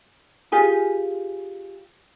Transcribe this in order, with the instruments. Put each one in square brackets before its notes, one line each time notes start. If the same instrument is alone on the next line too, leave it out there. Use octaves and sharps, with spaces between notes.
[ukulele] F4 G4 G#4 G#5